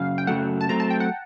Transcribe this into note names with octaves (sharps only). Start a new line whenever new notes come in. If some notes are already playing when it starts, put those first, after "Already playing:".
Already playing: F#2 C#3 F5
G5
F#2 C#3 F#3 A3 F#5
A5
F#3 A3 C4 A#5
A5
G5
F#5